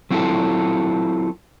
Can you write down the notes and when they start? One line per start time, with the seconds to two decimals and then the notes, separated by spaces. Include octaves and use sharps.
0.11 F#3 C4 E4 F4 A4